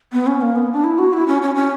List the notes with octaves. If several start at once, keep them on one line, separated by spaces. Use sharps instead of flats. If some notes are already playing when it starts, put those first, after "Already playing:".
B3
C#4
A#3
B3
D4
E4
F#4
E4
C#4
C#4
C#4